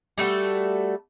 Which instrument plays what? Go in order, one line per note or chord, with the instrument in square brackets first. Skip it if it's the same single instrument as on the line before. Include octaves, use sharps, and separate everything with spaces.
[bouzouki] G3 A3 F#4 A4